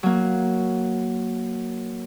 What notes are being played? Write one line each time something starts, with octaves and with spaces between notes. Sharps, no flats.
F#3 A#3